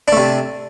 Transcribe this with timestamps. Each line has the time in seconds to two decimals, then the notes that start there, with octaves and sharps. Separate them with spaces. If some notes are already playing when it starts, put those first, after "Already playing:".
0.08 D4
0.12 A3
0.17 C3